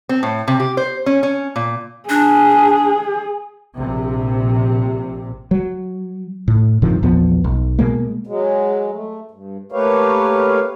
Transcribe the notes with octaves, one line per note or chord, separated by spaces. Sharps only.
C4
A2
C3
G4
C5
C#4
C#4
A#2
D4 G#4
A#1 C3
F#3
A2
G2 C3 D#3 F3
A#1 E2 F3 B3
B1
B2 G#3 A#3
F#3 G#3
A3
G2
A3 A#3 G4 B4 C#5 F5